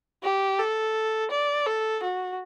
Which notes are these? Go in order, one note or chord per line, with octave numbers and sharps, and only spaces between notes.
G4
A4
D5
A4
F#4